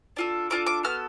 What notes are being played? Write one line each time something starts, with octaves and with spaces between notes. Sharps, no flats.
D4 F4 A4
D4 F4 A4 D6
D6
B3 F#4 A4 F6